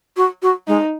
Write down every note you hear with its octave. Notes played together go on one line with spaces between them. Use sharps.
F#4
F#4
G#3 D#4